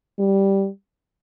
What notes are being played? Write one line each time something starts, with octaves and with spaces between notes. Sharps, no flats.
G3